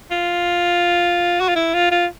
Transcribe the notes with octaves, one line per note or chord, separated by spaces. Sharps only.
F4
F#4
F4
E4
F4
F4